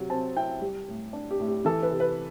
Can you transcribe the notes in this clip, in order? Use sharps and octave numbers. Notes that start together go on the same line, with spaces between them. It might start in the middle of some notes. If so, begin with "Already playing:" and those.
Already playing: C3 F#3
C4 A5
E4 G5
G3
A2
D4
G4
A2
G4
E3 A4
B4
C3
B4